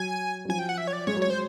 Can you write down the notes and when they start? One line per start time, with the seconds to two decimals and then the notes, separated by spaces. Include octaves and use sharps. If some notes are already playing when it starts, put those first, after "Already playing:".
Already playing: F#3 G#5
0.45 F#3
0.49 F3 G#5
0.59 G5
0.69 F#5
0.78 E5
0.87 C#5
0.93 D5
1.07 G#3 C#5
1.17 F#3
1.22 C#5
1.27 F#3
1.30 C5